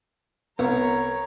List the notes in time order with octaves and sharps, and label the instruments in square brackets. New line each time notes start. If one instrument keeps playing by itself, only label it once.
[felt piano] C2 [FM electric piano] B3 [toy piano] B4 [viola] C#5 A#5